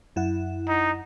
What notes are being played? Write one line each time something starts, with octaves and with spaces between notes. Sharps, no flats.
F#2 E4 F#5
D#4